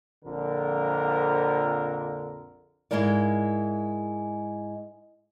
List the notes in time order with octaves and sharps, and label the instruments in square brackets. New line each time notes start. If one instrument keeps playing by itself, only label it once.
[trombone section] A#1 F2 D3 A#4
[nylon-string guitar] G#2 F#3 G#3 E4 A#4 D5